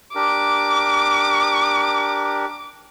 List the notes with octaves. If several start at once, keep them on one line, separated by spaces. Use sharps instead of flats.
D4 G4 A#4 D6